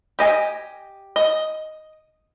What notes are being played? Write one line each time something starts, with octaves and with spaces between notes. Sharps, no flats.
G4 D#5 G#5
D#5